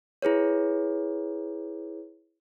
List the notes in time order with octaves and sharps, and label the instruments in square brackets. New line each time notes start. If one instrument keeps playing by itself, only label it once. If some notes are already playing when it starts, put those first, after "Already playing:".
[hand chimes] E4 G#4 B4 C#5